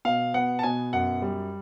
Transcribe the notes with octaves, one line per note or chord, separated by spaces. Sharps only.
B2 F5
B3 F#5
A5
B2 G#5
F#2 F#5
G3